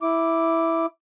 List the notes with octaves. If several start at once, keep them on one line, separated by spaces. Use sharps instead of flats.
E4 D6